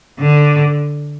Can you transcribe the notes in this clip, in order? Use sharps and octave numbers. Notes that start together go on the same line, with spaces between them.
D3